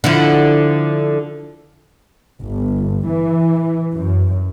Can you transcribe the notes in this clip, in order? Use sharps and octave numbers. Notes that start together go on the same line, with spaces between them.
D3 F3 E4
G1
E3
F#2